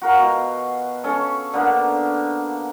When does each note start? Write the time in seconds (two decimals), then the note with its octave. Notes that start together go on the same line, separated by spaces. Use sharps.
0.02 F#4 A#4 F5
0.19 B2
1.04 C#4 A4
1.54 D3 A#3 B3